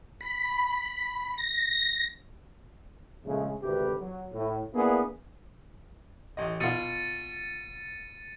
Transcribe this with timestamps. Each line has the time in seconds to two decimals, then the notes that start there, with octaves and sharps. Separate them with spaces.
0.21 B5
1.38 A#6
3.24 A#1 C#3 G#3 A3
3.61 G#1 D2 C3 A3 G4 B4
3.98 F#3
4.33 A2
4.73 A#3 B3 D4 E4 G#4
6.37 A1 D#5
6.60 B2 F4 A6 C#7 D#7